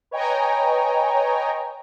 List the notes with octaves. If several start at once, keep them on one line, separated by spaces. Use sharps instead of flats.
B4 C#5 D#5 G5 G#5 A#5